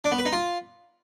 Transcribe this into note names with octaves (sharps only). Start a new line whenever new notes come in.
D4
B3
B4
D#4
F4